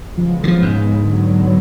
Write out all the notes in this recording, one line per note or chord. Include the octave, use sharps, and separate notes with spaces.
C#3 F3 G#3 B3
D3
F3
G#2
D3 F#3 B3